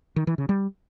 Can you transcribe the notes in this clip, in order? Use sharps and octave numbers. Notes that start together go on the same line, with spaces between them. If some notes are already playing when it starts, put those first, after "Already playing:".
D#3
E3
C#3
G3